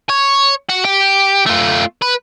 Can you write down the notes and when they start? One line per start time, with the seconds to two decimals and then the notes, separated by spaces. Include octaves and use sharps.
0.09 C#5
0.70 F#4
0.85 G4
1.46 A3 F4
2.02 B4